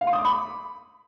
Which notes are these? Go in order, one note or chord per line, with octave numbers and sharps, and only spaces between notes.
F5
C6
D#6
D6
B5